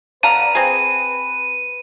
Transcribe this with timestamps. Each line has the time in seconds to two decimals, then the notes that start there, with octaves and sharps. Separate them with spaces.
0.23 D3 B4 F5 A#5 D#7
0.55 C4 G#4